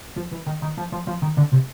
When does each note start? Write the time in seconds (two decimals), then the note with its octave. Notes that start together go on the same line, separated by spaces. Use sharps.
0.16 F3
0.31 E3
0.46 D#3
0.62 D#3
0.77 F3
0.92 F3
1.07 F3
1.22 D#3
1.37 D3
1.52 C3